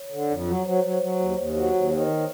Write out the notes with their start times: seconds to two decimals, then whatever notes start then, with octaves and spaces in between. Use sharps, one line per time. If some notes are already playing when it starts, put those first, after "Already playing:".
Already playing: C#5
0.12 D3
0.30 F2
0.47 F#3
0.66 F#3 C5
0.73 C#5
0.80 F#3 C5
1.02 F#3
1.19 D#2
1.38 D#2
1.56 F#3
1.74 D#2
1.92 D#3